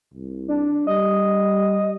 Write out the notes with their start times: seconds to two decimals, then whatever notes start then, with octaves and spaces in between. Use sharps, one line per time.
0.13 C2
0.48 D4
0.87 G3 D#5